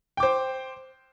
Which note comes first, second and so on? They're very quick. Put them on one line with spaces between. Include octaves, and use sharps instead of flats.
G5 D6 C5